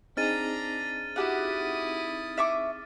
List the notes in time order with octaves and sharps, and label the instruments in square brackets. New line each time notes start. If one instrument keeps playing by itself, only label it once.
[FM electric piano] C4 D#4 G#4 [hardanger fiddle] D4 A#5 [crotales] F6 A6 D#7
[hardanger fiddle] E4 D#6 [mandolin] F#4 G4 F#5
[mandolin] E5 C#6 D6